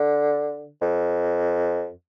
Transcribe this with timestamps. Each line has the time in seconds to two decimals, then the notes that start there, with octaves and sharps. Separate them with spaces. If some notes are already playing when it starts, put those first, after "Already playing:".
Already playing: D3
0.82 F2